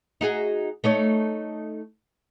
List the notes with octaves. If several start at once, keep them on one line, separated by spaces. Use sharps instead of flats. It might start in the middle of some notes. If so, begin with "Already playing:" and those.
D#4 F#4 G#4
A3 D#4 C#5